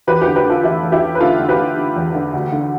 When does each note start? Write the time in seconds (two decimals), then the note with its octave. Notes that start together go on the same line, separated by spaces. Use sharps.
0.07 E2 G4 B4
0.22 D3 G4 B4
0.36 G4 B4
0.45 D3 F4 A4
0.64 E2 E4 G4
0.83 E2
0.92 E4 G4
1.01 E2
1.15 B4
1.21 D3 F4 A4
1.39 D3
1.49 G4 B4
1.58 D3
1.77 D3
1.96 E2
2.15 D3
2.33 D2
2.52 D3